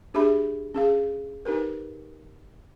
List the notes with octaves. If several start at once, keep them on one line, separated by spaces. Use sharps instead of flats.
D4 G4 G#4 E5 B5
C#4 G#4 F5
D#4 G4 A#4 B4